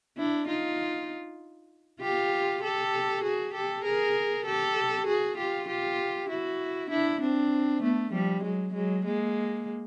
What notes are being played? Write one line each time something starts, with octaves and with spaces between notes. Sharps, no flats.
D4 E4
D#4 F4
F4 G4
G4 A4
F#4 G#4
G4 A4
G#4 A#4
G4 A4
F#4 G#4
F4 G4
F4 G4
E4 F#4
D4 E4
C4 D4
A3 B3
F3 G3
F#3 G#3
F#3 G#3
G#3 A#3